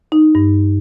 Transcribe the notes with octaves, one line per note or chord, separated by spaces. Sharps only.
D#4
G2